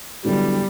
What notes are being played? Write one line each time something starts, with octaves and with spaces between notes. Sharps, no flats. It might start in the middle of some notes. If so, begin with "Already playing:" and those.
D3 F#3 G3 B3 E4